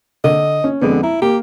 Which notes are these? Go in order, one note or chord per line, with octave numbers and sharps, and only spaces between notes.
D3 D#5
C#4
F2 D3 G#3 B3
E4 A#5
A#3 G4